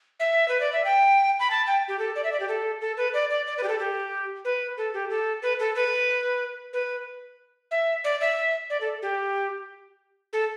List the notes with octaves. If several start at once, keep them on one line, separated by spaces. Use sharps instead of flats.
E5
B4
D5
E5
G5
B5
A5
G5
G4
A4
D5
E5
D5
G4
A4
A4
B4
D5
D5
D5
B4
G4
A4
G4
B4
A4
G4
A4
B4
A4
B4
B4
E5
D5
E5
D5
A4
G4
A4